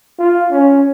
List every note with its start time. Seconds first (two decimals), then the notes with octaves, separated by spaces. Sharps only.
0.19 F4
0.51 C#4